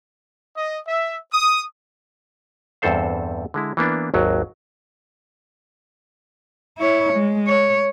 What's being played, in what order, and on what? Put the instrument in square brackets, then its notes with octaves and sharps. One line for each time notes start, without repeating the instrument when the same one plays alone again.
[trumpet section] D#5
E5
D#6
[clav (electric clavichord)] E2 G2 C4 A4 C5 F5
D3 G#3 E4
E3 A#3 B3 D4
G#1 D#2 F#3
[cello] E4 C#5
G#3
C#5